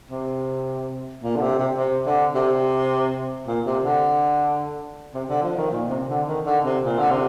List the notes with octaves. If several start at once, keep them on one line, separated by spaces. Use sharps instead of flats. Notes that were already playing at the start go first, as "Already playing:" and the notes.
C3
A#2
D3
C3
C3
C3
D3
C3
A#2
C3
D3
C3
D3
F3
D#3
A#2
C3
D3
D#3
D3
C3
A#2
D3
C3